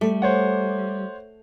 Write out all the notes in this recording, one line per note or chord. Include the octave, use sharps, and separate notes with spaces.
G3 A3
C5 C#5 F#5